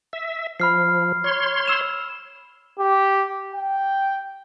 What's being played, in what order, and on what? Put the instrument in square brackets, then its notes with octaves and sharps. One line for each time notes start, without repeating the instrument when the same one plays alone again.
[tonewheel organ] E5
[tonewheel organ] F3 [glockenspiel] B5 F6 C7
[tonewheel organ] C#5 C6
[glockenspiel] E6 E7 F7
[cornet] G4
G5